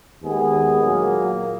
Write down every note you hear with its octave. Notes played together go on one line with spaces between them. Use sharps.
D#2 D#3 G#3 B3 G#4
A#2 F#3 A#3